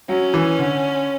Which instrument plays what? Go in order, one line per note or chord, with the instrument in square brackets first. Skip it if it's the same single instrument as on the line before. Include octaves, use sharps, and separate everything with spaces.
[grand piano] F#3 [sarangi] C#4
[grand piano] E3
D3